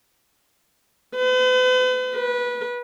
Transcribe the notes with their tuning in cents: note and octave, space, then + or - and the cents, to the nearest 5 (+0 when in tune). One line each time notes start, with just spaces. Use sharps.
B4 +45
B4 -20